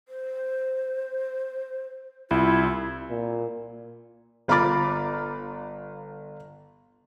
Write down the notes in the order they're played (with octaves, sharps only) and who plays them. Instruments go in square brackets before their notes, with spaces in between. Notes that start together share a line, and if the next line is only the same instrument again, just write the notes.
[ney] C5
[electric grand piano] C2 [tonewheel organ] E4 [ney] F4
[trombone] A#2
[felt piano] G1 F4 A#5 B5 D6 A6